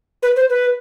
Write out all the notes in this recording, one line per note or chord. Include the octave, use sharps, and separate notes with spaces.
B4
C5
B4